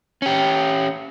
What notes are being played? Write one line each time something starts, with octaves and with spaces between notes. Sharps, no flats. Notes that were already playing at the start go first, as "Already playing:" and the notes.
C#4 G4